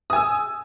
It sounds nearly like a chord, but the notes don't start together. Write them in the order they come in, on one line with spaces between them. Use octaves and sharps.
D#6 G#5 E6